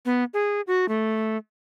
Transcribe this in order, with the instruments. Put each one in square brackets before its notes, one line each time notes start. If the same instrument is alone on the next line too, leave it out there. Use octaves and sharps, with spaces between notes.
[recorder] B3
G#4
F#4
A3